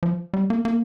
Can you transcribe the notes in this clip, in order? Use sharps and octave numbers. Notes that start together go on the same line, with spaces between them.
F3
G3
A#3
A#3